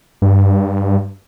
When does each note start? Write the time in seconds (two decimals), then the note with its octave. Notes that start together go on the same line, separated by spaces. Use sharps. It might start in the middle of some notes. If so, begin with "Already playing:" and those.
0.22 G2